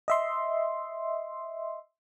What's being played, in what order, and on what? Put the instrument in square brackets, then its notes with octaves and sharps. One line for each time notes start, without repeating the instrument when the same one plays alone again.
[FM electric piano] D#5 E5 C6